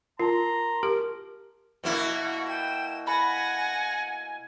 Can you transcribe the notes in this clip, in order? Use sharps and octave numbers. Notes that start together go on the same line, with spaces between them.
F4 A#4 A5 A#5 C6
G4 A#4
B2 A#3 E4 F#4
G5 E7
F#5 G#5 B5 A#6